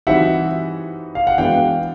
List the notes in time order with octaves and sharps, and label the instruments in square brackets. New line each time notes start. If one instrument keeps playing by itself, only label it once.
[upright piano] E3 G3 C4 D#4 F#4 [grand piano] E5 F#5
[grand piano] F5
F#5
[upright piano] E3 G#3 B3 D4 F#4 [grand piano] F5 G5